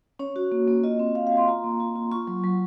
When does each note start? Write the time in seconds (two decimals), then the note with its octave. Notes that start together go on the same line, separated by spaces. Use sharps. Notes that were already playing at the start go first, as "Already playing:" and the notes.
0.19 C#4 C#5
0.36 F#4
0.52 A#3
0.68 A#3
0.84 F4 D#5
0.99 C4
1.15 F4 F5
1.27 F5
1.32 F4
1.37 C6
1.48 F4 A#5
1.64 A#3
1.80 F4
1.95 F4
2.12 F4 C#6
2.27 F#3
2.44 F#3